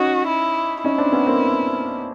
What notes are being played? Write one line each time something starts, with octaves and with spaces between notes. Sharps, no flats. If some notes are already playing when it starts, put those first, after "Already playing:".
Already playing: C#4 D#4 F#4
E4
C#4 D#4 E4
C4 D4
B3 C#4
A#3 C4